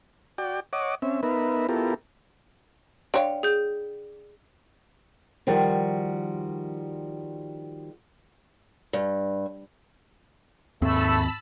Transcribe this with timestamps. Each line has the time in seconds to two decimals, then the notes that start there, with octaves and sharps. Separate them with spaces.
0.38 F#4 D5 G5
0.73 C#5 D#5 F#5 D6
1.02 C4 C#4 E5
1.23 B3 D#4 A#4 B4 E5
1.69 B3 E4 F4 G4 A4 A#4
3.14 D3 C#5 F5 G5
3.43 G#4 G6
5.47 D#3 F3 G3 F#4
8.93 G2
10.82 D#2 G#2 A3 C4 A5 B5 E6